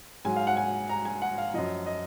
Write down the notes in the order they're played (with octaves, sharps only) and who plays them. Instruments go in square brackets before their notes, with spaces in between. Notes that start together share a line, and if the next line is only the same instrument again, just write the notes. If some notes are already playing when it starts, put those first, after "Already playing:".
[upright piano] G#2 F#3 G#5
F5
F#5
G#5
A#5
G#5
F#5
F5
F#2 F3 D#5
D#5